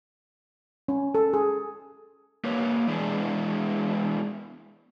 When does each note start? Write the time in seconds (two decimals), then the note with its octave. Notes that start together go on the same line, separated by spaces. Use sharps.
0.88 C#4
1.15 A4
1.33 G#4
2.44 A#3 G4 B4 C#5
2.88 E3 G#3 B3 D4 E4 G#4